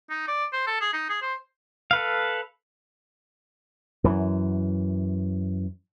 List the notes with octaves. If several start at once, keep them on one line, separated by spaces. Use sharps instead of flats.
D#4
D5
C5
A4
G#4
D#4
G#4
C5
A4 B4 F5
F#2 E3